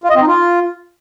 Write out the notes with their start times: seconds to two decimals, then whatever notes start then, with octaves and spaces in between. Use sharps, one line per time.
0.04 F4
0.10 D#5
0.16 C4
0.22 D#4
0.27 F4